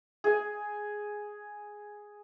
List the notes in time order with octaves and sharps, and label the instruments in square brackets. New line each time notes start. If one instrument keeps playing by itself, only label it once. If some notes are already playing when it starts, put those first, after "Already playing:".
[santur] G#4 G#5